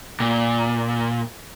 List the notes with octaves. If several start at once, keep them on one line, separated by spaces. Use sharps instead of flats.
A#2